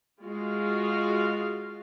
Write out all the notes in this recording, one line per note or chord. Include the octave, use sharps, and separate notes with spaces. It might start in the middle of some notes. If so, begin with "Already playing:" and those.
G#3 F4 F#4 F5